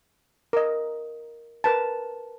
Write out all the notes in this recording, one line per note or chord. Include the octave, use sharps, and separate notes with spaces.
A#4 D#5
A#4 B4 A5